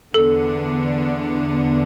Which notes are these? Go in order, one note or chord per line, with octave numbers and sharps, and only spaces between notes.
E2 D3 B3 D4 A4